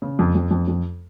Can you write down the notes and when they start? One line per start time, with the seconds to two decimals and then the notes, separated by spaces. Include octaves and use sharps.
0.02 C#3
0.19 F2
0.35 F2
0.51 F2
0.68 F2